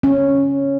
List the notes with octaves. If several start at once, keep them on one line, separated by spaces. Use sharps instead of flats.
C#4